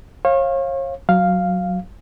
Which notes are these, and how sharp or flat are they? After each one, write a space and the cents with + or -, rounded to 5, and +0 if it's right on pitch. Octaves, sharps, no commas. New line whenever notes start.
C#5 -40 F5 +0
F#3 +0 F5 +0